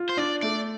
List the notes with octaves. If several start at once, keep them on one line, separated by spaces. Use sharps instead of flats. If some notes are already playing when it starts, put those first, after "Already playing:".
Already playing: F4
C5
D4 D5
A3 D5